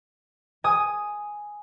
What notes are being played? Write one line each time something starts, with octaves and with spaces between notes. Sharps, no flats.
G#5 D#6